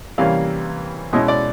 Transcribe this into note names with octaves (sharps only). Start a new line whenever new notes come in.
C3 E3 G3 A#3 C#4 F5
B2 G#3 C#4 E4 D#5
D5